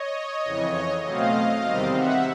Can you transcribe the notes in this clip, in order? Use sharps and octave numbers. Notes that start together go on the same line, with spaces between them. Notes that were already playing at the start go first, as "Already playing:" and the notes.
Already playing: C#5 D#5
F2 C#3 E3
B2 F#3 A3 C4 D#5 F5
E2 C3 D#3 G3 C4
E5 F#5